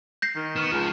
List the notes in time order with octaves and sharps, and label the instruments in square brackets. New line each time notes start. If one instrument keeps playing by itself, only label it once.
[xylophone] G6 A#6 C7
[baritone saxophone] D#3
[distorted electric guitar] B3 [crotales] C#6 F6 E7
[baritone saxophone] C#2 [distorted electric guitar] F3